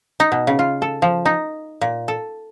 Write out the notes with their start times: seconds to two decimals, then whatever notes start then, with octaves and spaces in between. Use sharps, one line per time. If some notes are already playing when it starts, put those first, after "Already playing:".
0.20 D#4
0.32 B2
0.47 C#3
0.59 F4
0.82 A4
1.02 F3
1.25 D#4
1.81 A#2
2.08 A4